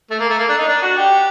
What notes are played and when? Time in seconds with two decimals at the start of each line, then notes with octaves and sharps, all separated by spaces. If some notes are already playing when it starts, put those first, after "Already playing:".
0.11 A3
0.20 A#3
0.30 A3
0.39 A#3
0.49 D4
0.58 D#4
0.68 D4
0.82 F#4
0.97 G4